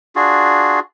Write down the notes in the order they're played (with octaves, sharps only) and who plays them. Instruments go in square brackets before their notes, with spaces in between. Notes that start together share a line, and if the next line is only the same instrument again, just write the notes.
[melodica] D4 F4 F#4 G#4